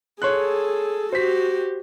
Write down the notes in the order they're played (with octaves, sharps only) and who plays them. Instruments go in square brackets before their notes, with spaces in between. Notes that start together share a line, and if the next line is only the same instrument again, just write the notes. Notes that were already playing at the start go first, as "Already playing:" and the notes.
[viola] G#4 A4 [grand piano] C#5 C6 F#6
[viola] F#4 G4 [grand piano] C5 B6